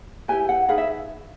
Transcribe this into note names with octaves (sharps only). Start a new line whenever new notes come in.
E4 G4 B4 G#5
F#5
D#4 G#4 B4 F5
E5